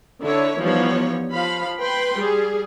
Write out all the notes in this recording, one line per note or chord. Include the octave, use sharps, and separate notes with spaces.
D3 E4 C#5
E3 F3 G3 B3 D#4 C#5
F3 F5 B5
B4 G5 B5 C6
G3 G#4